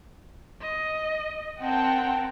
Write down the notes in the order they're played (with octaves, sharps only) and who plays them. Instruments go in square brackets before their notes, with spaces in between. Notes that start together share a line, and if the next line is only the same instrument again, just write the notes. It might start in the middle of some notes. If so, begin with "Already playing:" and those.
[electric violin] D#5
[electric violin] C4 A#4 [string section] F#5 G5 A5